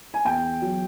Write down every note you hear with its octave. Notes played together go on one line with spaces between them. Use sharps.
G#5
E2 G5
F#3